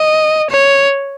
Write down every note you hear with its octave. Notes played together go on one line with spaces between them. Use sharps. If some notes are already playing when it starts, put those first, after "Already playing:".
Already playing: D#5
C#5